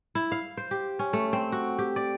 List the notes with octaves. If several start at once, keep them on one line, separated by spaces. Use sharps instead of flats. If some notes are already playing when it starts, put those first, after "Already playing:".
E4
F5
C5
G4
C#4
A3
C4
F#4
G4
D5